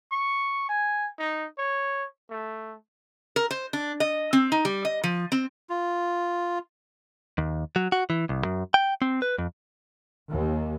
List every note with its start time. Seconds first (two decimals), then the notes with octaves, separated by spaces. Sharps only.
0.12 C#6
0.69 G#5
1.19 D#4
1.58 C#5
2.30 A3
3.36 A#4
3.51 C5
3.73 D4
4.00 D#5
4.33 C4
4.52 D#4
4.65 G3
4.85 D#5
5.04 F3
5.32 C4
5.70 F4
7.38 D#2
7.76 F#3
7.92 F#4
8.10 E3
8.29 C2
8.45 F#2
8.74 G5
9.02 C4
9.22 B4
9.38 F2
10.31 D#2